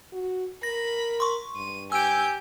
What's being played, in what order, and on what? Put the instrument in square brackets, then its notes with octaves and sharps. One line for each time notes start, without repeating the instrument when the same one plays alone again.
[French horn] F#4
[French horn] A#4 [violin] B5 [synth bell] A#6
[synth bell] C6 C#6
[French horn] G2 [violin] D#7
[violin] G4 G6 [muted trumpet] G#5 [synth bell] E6 D7